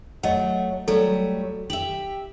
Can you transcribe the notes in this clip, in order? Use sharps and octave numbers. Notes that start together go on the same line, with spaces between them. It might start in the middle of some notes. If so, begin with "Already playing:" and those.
F#3 A3 D#5 F#5
F#3 G3 A3 A4
G4 E5 F#7